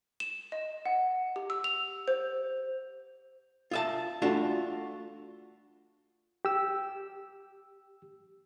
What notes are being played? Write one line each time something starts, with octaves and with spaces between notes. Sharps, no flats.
E7
D#5
F#5
G4
E6
F7
C5
F4 E5 A5
A3 D4 F4 F#4
G4 E6